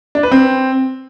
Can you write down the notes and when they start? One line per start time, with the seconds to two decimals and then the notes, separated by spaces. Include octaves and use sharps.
0.15 D4
0.23 B4
0.32 C4